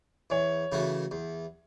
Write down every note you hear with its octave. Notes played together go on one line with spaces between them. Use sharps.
E2 C#5
C#3 E3 A3 F#4
E2